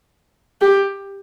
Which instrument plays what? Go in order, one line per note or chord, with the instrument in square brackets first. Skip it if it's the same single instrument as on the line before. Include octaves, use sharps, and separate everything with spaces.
[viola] G4